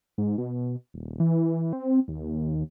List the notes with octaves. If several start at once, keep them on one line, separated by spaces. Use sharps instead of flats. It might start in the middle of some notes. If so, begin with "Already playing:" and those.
G#2
B2
D#1
E3
C4
D#2